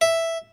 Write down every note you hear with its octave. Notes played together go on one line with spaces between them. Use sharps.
E5